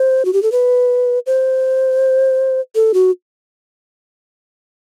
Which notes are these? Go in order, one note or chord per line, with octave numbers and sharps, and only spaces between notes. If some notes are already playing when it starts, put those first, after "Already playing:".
Already playing: C5
F#4
G4
A4
B4
C5
A4
F#4